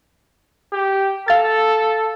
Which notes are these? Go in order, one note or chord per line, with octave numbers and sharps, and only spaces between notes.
G4
A4 F5 A6